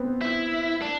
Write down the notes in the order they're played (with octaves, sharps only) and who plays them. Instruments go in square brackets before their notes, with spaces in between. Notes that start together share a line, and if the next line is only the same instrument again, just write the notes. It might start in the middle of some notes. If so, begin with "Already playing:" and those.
Already playing: [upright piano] B3 C4
[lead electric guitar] E4
D4